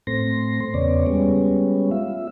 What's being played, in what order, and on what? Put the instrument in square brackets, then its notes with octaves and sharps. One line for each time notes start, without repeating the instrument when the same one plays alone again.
[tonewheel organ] A2 A3 C4 C6 A#6
E2 C#3 B3 C#5 D5
G3 G#3 B3 C#4
F4 E5